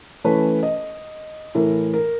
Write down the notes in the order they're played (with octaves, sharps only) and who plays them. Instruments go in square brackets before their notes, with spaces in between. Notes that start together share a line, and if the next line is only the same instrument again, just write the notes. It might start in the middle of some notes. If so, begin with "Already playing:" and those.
[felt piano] E3 A3 C#4 B4
D#5
A2 E3 A#4
A#4